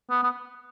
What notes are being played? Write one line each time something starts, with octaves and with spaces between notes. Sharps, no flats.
B3
B3